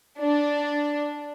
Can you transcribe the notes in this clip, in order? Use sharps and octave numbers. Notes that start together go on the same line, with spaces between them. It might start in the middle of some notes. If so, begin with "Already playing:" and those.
D4